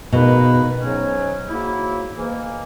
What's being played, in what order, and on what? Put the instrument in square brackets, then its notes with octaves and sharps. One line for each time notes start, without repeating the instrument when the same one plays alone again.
[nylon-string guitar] B2 [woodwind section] D#3 A#3 D#4 G#4 B4
[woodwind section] G#2 F#3 C#4
G#2 F#3 A#3 E4
G#2 E3 A#3